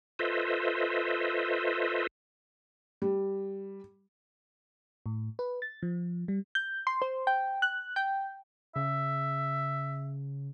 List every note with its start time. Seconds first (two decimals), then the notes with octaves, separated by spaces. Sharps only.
0.19 F4 A4 B4 C5 D#5 E5
3.02 G3
5.06 A2
5.39 B4
5.62 A6
5.83 F3
6.28 G3
6.55 G6
6.87 C6
7.02 C5
7.27 G5
7.62 F#6
7.96 G5
8.76 C#3 E5